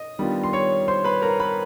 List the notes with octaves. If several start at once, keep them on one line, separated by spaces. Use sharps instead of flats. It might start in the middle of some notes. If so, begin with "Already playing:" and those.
Already playing: D#5
D#3 G3 B3 D4 F4
C6
C#5 C#6
C5 C6
B4 B5
A#4 A#5
B4 B5